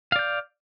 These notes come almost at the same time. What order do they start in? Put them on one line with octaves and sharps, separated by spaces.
F5 D5 G6